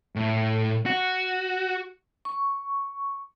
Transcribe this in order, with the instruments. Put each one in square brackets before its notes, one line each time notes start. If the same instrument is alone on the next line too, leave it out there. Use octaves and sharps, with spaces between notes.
[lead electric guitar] A2
F#4
[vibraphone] C#6